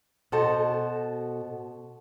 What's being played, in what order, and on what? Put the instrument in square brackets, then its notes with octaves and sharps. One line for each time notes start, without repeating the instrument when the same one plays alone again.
[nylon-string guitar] B2 F#4 A4 C5 A5